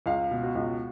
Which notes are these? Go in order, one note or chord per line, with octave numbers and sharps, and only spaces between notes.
C#2 F5
B2
F#4
C#2